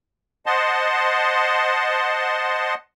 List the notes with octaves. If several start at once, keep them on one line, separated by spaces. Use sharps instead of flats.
C5 D#5 F#5 A5 C6